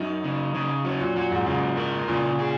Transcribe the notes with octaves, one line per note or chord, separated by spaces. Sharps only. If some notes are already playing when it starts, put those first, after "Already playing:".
Already playing: F#2 D#4
C#3
C#3
F#3 C#4
A#2
A#2 F#3
G#2
G#2 C#3
A#4
A#2 C#3
G#4